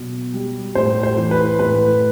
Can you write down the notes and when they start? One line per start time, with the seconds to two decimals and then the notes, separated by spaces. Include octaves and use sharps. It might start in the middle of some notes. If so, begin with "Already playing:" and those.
Already playing: B2 F#3
0.34 G3
0.75 A2 C5
1.03 C5
1.17 E3
1.31 B4
1.59 A2 B4